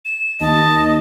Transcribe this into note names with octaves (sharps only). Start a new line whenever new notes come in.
E7
D#2 D#5 A5